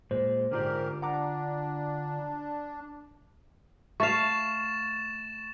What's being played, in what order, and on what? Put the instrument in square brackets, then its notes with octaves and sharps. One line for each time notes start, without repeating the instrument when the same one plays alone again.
[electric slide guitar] A#2 G#3 [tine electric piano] C5
[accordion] G#2 G4 A#4 [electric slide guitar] D3 F4 D5
[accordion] D4 [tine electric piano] F#5 A#5 D6
[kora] A3 F5 [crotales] C#6 A6 E7